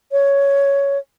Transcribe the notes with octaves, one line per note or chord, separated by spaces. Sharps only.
C#5